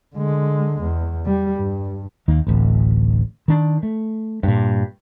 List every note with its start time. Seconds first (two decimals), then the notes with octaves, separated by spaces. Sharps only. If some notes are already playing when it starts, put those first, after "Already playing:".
0.15 D3 G#3
0.82 E2
1.25 G3
1.54 G2
2.28 D#2 D#3 A#3
2.47 D1 A1
3.48 D#3 D4
3.83 A3
4.43 G2 A#2